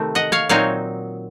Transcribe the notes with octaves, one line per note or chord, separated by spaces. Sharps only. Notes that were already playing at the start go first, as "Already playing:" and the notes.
Already playing: C3 D#3 A3 C4
D#5 F#5
C#5 F5
A#2 F#3 C4 D#4 C#5 F5